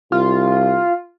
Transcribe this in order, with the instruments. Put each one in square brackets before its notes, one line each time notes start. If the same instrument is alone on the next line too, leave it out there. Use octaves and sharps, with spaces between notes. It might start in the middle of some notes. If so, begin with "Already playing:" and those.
[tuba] C2 [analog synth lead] F4